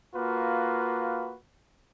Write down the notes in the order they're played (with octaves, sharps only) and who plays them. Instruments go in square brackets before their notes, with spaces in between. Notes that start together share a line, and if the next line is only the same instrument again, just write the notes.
[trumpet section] A#3 F4 F#4 B4